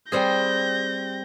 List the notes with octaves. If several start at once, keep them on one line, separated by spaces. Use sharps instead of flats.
G3 C4 G#4 G6 A#6